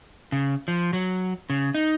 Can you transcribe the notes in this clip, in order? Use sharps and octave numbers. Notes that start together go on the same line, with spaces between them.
C#3
F3
F#3
C#3
D#4